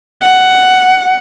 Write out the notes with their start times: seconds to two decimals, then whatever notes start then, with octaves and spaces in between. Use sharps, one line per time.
0.22 F#5